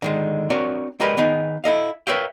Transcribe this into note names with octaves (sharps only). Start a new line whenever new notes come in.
D3 D#3 G#3
C4 D4 F#4 A#4 C#5
G#3 G4 A#4 B4 D5 B5
D#3 B3 D#4 G#4
E4 A4 D#5 F5
A#4 B4 C#5 E5 F5 G5